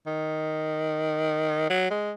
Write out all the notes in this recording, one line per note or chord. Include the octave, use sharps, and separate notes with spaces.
D#3
F#3
G#3